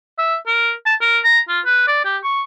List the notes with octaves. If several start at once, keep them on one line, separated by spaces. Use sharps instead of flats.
E5
A#4
A5
A#4
A#5
F4
B4
D5
G4
C#6